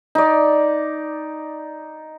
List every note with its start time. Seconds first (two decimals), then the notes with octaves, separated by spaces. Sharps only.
0.15 D#4 D5